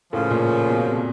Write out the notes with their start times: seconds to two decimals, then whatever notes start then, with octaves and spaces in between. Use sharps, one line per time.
0.12 A2 C#3 F3 A#3 C#4 F4
0.30 A#2
0.67 B2
0.87 C3